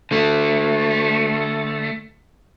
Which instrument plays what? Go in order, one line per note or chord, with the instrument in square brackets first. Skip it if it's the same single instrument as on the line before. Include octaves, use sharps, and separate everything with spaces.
[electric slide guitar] D3 A3